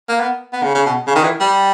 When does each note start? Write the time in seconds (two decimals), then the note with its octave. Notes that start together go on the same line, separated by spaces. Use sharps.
0.09 A#3
0.20 B3
0.53 B3
0.63 C#3
0.75 C#3
0.86 B2
1.07 C#3
1.15 D#3
1.24 E3
1.40 G3